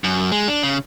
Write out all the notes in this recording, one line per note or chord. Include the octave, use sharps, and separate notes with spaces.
F#2
G#3
D4
C#3